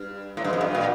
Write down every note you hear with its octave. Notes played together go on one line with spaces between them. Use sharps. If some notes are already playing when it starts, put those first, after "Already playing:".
Already playing: G2
A2
G2
F2
G2
A#2